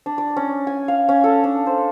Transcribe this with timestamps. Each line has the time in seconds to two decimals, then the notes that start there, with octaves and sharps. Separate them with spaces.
0.06 D4
0.18 D5
0.37 C#4
0.67 G#5
0.88 F5
1.09 C#4
1.24 A4
1.44 D4
1.66 C5